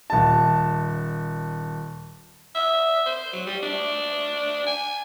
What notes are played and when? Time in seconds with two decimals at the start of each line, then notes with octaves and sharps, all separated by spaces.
0.10 D#1 A5
2.55 E5
3.06 C5
3.33 F#3
3.46 G3
3.63 D4
4.67 G#5